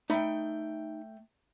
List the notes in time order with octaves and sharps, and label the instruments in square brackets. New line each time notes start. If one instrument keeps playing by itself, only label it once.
[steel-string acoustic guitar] A3 G5 [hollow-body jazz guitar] D#4 B5